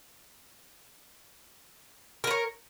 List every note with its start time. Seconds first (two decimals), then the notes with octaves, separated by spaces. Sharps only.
2.24 A#4
2.27 B4
2.31 C#5